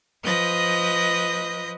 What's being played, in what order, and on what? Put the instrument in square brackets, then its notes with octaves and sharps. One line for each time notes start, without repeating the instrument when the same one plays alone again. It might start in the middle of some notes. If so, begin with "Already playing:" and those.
[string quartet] F3 B4 D#5 G6 A#6